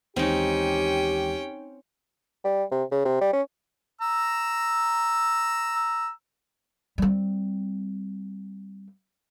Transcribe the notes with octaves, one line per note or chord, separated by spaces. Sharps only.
D#2 E3 G#3 C4 C#4 D#4 G4 G5
G3
C3
C#3
C3
G3
C#4
A#5 E6
G3 C4